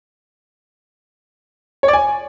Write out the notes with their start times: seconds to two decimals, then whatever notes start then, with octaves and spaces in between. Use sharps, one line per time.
1.83 C#5
1.88 D5
1.93 G#5